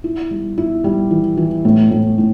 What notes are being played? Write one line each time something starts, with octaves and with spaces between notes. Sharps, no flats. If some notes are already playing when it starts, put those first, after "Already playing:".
E4
G3
E4
G3
E3
E3
A2
A2
A2